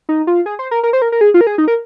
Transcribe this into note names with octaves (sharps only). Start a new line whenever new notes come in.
D#4
F4
G#4
C5
A#4
A#4
C5
A#4
A#4
G#4
F4
A#4
G#4
D#4
A#4